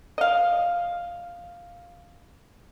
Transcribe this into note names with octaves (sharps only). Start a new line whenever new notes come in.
D#5 F5